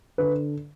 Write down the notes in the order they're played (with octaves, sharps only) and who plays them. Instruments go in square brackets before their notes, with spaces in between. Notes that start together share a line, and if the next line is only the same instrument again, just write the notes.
[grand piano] D3 B4